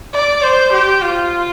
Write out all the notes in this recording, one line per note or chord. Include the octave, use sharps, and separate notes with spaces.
D5
C5
G4
F4